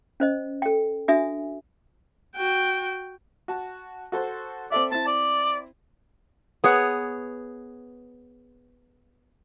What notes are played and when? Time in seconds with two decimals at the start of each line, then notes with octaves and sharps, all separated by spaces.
0.20 C#4 C5 D#5
0.62 A4 G5
1.08 D4 F#4 E5 G#5 D#6
2.36 F#4 G5
3.48 F#4 A5
4.12 F#4 A4 C5
4.72 C4 A4 D5 E5
4.92 C4 E4 A5
5.07 D5
6.64 B3 G#4 C#5 F#5